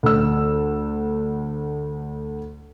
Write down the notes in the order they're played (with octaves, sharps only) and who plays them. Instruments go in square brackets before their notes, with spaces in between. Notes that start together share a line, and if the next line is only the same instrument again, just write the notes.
[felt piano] D2 E6